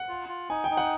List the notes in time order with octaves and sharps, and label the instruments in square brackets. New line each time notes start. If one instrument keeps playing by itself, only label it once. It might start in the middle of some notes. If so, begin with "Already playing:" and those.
Already playing: [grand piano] F#5
[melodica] F4
F4
[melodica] D#4 [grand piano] G#5
[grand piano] G5
[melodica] D#4
[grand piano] F#5